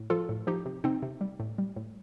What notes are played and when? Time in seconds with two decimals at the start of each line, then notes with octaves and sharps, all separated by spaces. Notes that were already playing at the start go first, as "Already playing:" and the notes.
Already playing: A2
0.10 F3 F4 A4
0.29 A2
0.47 F3 D#4 G4
0.66 C3
0.84 C3 C4 D#4
1.02 C3
1.21 G3
1.40 A2
1.58 G3
1.76 A2